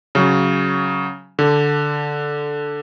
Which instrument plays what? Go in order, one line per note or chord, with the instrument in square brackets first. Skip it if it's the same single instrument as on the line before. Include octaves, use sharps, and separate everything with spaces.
[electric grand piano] C#3 F#3
D3